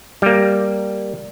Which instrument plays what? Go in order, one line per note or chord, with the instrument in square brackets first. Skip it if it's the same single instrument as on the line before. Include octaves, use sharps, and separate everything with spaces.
[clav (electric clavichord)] G3 A#3